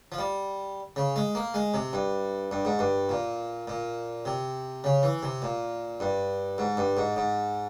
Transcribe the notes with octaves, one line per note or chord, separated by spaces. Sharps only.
F3
G3
C#3
G#3
A#3
G#3
C3
G2
G2
G#2
G2
A#2
A#2
C3
C#3
E3
C3
A#2
G2
G#2
G2
G#2
G#2